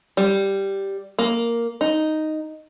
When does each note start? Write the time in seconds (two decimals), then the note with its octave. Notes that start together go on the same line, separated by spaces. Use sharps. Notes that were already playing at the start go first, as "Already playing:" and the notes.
0.17 G3
1.19 A#3
1.81 D#4